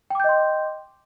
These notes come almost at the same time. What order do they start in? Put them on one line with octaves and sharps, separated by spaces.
G5 D6 G6 D#5 C6